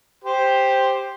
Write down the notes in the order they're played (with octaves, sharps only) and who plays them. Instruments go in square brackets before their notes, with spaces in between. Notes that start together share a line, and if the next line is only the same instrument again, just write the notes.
[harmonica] G4 C5